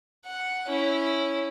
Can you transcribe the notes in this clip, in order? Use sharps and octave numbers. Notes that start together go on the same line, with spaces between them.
F#5
C#4 E4